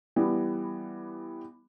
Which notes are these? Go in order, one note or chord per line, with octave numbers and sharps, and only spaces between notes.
E3 G3 B3